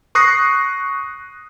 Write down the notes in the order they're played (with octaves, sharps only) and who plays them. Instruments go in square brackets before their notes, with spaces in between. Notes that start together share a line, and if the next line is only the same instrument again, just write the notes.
[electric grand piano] C#6 D#6 F#6 A#6 C7